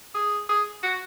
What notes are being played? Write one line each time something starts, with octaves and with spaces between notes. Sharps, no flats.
G#4
G#4
F#4